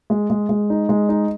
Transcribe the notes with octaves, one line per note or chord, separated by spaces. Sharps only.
G#3
G#3
G#3
D#4
G#3
D#4